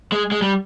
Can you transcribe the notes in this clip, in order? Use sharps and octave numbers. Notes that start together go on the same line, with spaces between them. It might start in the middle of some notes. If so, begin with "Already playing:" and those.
G#3
G#3
G3